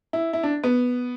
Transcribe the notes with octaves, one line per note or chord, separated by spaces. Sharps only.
E4
E4
D4
B3